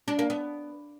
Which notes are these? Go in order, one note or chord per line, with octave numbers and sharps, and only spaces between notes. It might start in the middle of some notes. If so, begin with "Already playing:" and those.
D4
A#3
B3